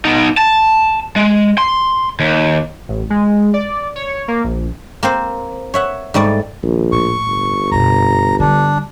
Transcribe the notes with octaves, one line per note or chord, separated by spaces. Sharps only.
B3 D#4
A5
G#3
C6
D#2
A1
G#3
D5
C#5
A#3
A#1
A#3 C4 C5
C#5 E5 F#5
G#2 G3 A3 D5
A#1 D#3
A2 C#6
G1
F#2 B2 A#5
D3 G3 D4